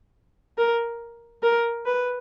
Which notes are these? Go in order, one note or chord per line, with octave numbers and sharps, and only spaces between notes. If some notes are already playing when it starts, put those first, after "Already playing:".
A#4
A#4
B4